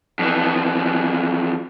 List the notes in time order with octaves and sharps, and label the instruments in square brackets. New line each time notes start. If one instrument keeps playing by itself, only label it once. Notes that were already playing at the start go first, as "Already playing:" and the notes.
[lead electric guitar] F2 E3